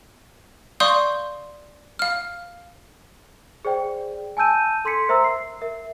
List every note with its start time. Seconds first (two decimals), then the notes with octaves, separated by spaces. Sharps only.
0.80 D5 F5 C6 C#6 D#6 G6
1.99 F5 F6
3.65 G#4 C5 D5 G5
4.37 G#5 A5 E6 G6 D#7
4.85 A4 C6 G#6 B6 C#7
5.09 A#4 C5 E5 A#5 C6 E6
5.24 C7
5.61 A#4 E5